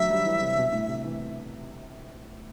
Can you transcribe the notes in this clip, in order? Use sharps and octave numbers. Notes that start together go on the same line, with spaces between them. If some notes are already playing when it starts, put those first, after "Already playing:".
Already playing: F#3 A3 E5
G3
E3
C3
B2
A2
C3
E3